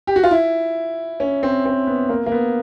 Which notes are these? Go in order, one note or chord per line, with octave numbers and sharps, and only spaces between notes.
G4
F#4
F4
E4
C#4
C4
C4
B3
A#3
A#3
B3